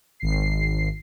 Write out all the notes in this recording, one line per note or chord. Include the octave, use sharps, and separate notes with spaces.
G#1 C7